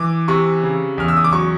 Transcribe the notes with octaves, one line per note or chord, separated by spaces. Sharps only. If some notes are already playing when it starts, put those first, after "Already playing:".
Already playing: E3 D6
C3 C#6
C#3
E2 F6
E6
D#6
D6
F#3 C#6